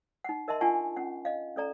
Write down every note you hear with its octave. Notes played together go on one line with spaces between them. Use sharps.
D#4 F#5
A#4 D#5 E5 A5 C6
D4 F4 F#5 G#5 A5 C#6
C#4 F#5
D#5 F5
C#4 A4 D5 A#5